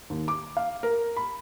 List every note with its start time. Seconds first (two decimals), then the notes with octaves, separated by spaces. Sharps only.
0.10 D#2
0.28 D6
0.57 F5
0.83 A#4
1.16 B5